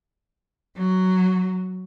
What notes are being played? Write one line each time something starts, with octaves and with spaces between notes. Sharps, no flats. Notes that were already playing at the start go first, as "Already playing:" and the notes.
F#3